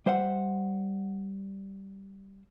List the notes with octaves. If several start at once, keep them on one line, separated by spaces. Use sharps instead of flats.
G3 C5 E5 F#5